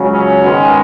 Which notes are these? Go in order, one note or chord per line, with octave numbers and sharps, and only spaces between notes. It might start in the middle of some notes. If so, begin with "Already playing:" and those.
Already playing: C#2 C#3 F#3
C#4
G#2 D#3 G#3 B3